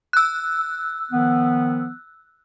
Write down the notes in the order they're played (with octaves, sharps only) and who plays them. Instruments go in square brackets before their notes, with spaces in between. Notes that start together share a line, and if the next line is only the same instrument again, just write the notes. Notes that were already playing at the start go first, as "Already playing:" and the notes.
[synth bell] E6 F#6
[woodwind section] D#3 F3 B3